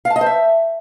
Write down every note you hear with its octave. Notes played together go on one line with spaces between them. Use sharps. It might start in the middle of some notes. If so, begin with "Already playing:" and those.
F5
A5
D#5
C5
E5